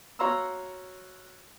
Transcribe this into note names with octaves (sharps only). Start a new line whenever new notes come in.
F#4 C#5 F5 A#5 C6 E6